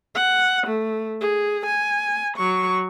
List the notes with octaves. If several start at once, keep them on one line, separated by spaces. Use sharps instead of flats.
F#5
A3
G#4
G#5
F#3 C#6